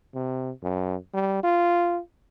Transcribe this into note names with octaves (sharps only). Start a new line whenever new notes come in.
C3
F#2
G3
F4